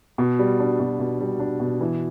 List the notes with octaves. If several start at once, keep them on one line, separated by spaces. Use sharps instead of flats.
B2
G3
D4
B2
B2
G3
D4
B2
E3